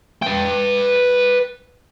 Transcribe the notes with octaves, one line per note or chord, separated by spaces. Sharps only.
B4 G5